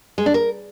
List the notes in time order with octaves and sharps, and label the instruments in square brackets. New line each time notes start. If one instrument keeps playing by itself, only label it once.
[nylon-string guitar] G#3
D4
A#4